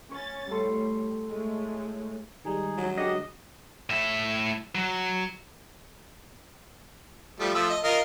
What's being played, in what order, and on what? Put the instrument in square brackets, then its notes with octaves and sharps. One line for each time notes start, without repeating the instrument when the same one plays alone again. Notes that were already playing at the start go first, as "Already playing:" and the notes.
[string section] C#4 A6 [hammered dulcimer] C#5
[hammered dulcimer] A2 A4 C6 [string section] G3
[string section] G#3 A3
[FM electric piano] D#3 G3 G#3 [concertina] D#4 G#4
[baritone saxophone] F#3
[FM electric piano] D3 G#3 F#4 [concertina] G4 F#5 [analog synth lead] D#5
[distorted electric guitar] A2 E5
F#3
[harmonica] F3 G3 A3
F3 A3 E6
D#5
F4 A#4 D#5